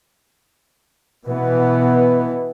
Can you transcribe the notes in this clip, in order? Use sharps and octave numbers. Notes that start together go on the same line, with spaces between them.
B2 E3 B3